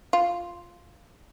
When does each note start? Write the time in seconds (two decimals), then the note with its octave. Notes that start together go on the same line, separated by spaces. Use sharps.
0.13 F4